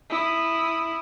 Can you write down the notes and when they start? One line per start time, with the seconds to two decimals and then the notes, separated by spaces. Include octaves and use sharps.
0.10 E4 D#6